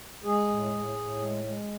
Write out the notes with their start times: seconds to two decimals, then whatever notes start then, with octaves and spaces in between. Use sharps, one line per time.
0.24 G#3 G#4
0.48 A2
0.72 A2
0.95 A2
1.19 G#3
1.43 G#3